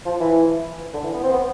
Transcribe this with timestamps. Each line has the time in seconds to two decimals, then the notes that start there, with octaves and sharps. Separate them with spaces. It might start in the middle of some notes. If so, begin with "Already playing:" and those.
0.05 F3
0.20 E3
0.94 D3
1.03 E3
1.14 B3
1.23 C4
1.33 B3